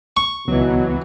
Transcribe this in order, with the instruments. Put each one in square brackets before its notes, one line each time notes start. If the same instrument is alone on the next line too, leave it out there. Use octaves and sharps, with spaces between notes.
[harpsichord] C#6
[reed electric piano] C#2 B3 [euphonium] B2 [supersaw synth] E3 F#3